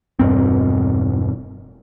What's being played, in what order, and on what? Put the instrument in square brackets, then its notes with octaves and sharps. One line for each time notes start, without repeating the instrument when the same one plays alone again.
[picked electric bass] E1 G2 C4